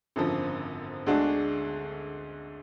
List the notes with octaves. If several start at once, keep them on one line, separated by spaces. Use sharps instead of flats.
G#1 F#2 D3 F3
D2 D3 G#3 D4 F#4